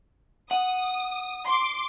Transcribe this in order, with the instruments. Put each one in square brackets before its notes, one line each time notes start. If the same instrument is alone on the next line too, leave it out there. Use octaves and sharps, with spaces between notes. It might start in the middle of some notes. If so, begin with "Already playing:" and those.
[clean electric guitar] F#5 [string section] D#6
[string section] C6 D6